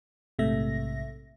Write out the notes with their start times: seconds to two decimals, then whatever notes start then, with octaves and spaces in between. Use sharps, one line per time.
0.39 A#1 G#2 C3 A3 E5 A#6